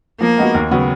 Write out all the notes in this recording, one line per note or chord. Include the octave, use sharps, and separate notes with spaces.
F3 A#3
G#3 B3 D#4 F#4
D#2
C#3 F#3 B3